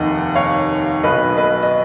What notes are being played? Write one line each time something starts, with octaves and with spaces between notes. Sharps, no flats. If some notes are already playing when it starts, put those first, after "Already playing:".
Already playing: F1 D#2 D#3 D#5 F#5
C#5 F5
B1 B2 B4 D#5
B4 D#5
D#5